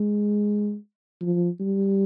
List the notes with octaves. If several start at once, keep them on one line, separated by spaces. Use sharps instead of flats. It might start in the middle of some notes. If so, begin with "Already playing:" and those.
Already playing: G#3
F3
G3